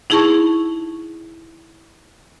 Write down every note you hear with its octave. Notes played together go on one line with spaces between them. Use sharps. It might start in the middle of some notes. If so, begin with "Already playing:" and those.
D#4 E4 G#4 A5 C#6